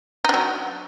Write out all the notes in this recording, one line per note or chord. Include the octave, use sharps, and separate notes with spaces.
F#3 D4 D#4